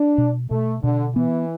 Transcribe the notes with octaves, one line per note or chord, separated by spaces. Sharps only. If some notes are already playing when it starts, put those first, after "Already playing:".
Already playing: D4
B2
B2 A3
B2 D3
E3 B3